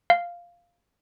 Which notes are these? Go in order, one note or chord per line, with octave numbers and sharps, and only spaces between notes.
F5